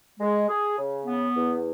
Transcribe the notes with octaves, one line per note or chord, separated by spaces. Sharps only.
G#3
G#4
C#3
B3
E2